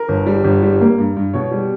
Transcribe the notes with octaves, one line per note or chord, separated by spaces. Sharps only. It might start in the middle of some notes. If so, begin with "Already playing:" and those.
Already playing: A#4
G1
G3
G1
G3
A#3
G2
G2
B2 C#5
G3